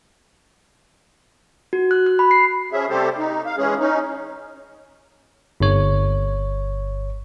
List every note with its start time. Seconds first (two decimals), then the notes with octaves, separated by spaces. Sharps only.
1.73 F#4
1.91 F#6
2.06 F#6
2.19 B5
2.31 C7
2.72 F3 C#4 G#4 E5
2.89 C3 G3 A3 G4 A4 C5
3.18 D#4
3.46 F5
3.57 E3 G#3 C#4 G#4
3.79 C#4 D#4
5.60 G1 C#5